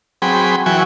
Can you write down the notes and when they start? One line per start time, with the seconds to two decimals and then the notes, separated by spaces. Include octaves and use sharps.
0.22 F#3 C4 G#4 G5 B5
0.66 E3 F#3 F#4 G5 G#5